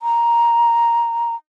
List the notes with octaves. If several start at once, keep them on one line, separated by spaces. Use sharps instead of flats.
A#5